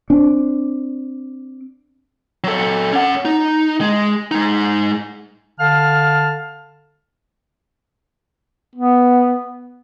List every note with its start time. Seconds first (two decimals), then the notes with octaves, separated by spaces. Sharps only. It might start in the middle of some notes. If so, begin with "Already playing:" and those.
0.10 C4 D4
2.44 F#3 A4
2.92 C#4 F#5
3.25 D#4
3.81 G#3
4.31 G#3 D#4
5.60 D3 F5 A5 F6
8.75 B3